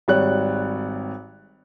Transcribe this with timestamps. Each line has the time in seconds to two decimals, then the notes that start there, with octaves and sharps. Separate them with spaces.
0.08 G#1 G3 C#5 F#6